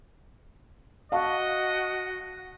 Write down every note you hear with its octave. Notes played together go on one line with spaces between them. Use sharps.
F#4 D#5 F5 A5 C#6